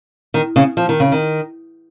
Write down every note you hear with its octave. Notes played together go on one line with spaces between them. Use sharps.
D#3
C#3
F3
D#3
C#3
D#3